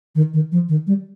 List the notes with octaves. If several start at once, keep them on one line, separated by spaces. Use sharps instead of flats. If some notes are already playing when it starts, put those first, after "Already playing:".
D#3
D#3
F3
D#3
G3